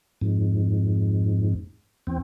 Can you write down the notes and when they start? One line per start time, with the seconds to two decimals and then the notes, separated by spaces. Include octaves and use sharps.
0.21 F2 G#2
2.07 E2 C4